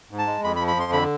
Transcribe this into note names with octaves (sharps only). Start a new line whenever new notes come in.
G#2
A5
G#3
F2 B5
B5
F3
B5
F2 C6
D3 B5